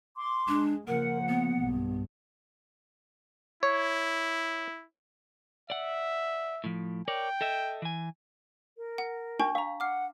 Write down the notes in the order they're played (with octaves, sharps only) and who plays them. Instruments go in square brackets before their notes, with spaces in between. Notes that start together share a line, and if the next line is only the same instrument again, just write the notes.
[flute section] C6 D6
[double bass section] G#3 [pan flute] D4
[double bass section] C#3 F3 A#3 [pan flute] A#4 [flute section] F#5
[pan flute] B3
[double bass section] B1 G2
[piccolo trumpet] E4 [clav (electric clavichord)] C#5
[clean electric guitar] D5 F#5 [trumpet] E5
[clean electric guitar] A2 F3
[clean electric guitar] A#4 C#5 D5 [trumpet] G5
[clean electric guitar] A4 D#5 E5
E3 G#5
[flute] A#4
[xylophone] F#5
[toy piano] D4 [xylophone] G5 C#6
[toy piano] F5 [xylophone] A#5 C#6
[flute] F#5 [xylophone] D6 F6 C7